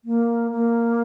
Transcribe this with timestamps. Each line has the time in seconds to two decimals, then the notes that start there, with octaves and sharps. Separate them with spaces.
0.05 A#3
0.51 A#3